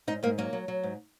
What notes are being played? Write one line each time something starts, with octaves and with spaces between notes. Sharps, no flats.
G#2 D#4
G#2 A#3
F#3 A#3
F#3
F#3
G#2